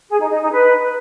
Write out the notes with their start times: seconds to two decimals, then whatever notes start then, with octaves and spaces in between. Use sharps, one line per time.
0.09 G#4
0.20 D#4
0.30 D#4
0.41 D#4
0.52 B4